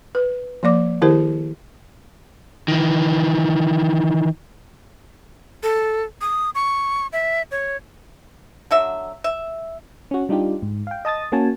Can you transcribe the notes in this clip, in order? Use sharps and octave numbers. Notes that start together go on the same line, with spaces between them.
B4
F3 A#3 D5 D6
D#3 E4 G4 A#4 C5
D#3 E3
A4
D#6
C#6
E5
C#5
D3 F#3 E5
E5
C#4 F#4
G3 D4 D#4 F4 G4
G#2
F5 G5
D#5 A5 D#6 A6
A#3 C#4 F#4 G#5 A5